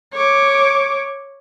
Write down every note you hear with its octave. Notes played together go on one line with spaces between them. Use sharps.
C#5 D6